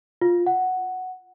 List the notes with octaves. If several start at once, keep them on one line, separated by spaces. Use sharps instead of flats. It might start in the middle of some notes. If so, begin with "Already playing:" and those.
F4
F#5